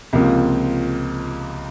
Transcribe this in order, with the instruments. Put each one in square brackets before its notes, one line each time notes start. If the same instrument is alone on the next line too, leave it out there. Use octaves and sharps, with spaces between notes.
[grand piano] C#2 C3 F3 A#3